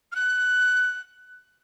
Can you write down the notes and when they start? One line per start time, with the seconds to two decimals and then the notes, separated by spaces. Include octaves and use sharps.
0.12 F6
0.15 F#6